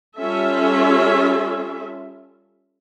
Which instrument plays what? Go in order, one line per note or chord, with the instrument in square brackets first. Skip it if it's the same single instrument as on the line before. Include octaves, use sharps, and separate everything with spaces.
[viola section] G3 C#4 F4 A4 E5